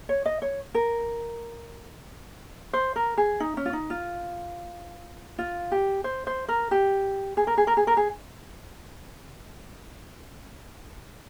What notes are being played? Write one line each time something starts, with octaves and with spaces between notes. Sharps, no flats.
C#5
D#5
C#5
A#4
C5
A#4
G#4
D#4
C#4
F4
D#4
F4
F4
G4
C5
C5
A#4
G4
G#4
A#4
G#4
A#4
G#4
A#4
G#4